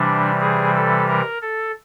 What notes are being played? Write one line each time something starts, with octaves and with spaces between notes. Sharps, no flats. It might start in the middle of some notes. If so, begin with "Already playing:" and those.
Already playing: C3 E3 G3 D4
G#4
A4
A#4
A4